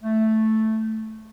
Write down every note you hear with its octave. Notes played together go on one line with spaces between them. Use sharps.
A3